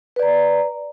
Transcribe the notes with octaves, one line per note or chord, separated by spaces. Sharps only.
B4 D5 A#5